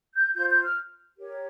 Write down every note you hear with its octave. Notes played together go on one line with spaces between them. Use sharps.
G6
F4 C5 G6
G6
F6
G4 A#4 C#5